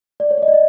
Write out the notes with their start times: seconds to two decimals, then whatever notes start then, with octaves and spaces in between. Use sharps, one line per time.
0.20 D5
0.31 C#5
0.38 D5
0.42 D#5
0.48 D5
0.54 D#5